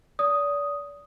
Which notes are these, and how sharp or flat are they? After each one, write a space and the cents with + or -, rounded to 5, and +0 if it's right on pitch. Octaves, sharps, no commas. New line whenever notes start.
D5 -35 D#6 +0